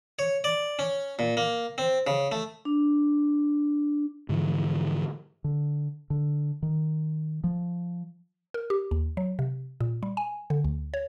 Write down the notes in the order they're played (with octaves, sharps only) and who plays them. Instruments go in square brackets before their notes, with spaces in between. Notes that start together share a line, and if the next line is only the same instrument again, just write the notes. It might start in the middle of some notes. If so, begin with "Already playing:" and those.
[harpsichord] C#5
D5
C#4
A#2
A#3
C4
C#3
A3
[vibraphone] D4
[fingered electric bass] G#2 D3 E3 F3
D3
D3
D#3
F3
[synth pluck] A#4
G4
D#2
F#3
C3
A#2
G3
G#5
D3
D2
C#5